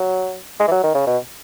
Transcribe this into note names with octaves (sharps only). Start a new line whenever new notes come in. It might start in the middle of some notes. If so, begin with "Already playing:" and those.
Already playing: F#3
G#3
E3
F#3
D#3
C#3
B2